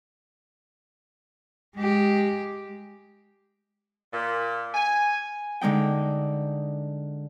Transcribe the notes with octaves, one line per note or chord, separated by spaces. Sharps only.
G#3 G4
A#2
G#5
D3 G#3 D#4 G5